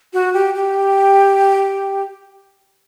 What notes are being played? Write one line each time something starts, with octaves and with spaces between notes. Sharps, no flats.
F#4
G4
G4